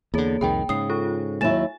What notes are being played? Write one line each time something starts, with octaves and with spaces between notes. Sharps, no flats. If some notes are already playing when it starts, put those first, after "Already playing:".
E2 D3 A#3 G#4 C#5
C2 F2 D#3 G#4 G5 B5
G#2 C#3 D#6 C7
F4 A4 C#6
D#2 F#3 E4 G#5 A6 E7